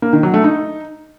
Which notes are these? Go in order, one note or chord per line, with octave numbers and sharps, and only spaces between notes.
A#3
D#3
F#3
A3
D#4